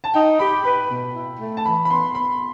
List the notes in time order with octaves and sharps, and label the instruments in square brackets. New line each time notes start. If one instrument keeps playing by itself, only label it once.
[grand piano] A5
[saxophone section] D#4 [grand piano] G5
[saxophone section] G4 [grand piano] B5
[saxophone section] B4 [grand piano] B5
[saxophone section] B2
E4
A3
[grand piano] A5
[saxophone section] E3 [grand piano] B5
[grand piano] B5
[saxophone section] B3 [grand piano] C6
[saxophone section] B3 [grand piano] B5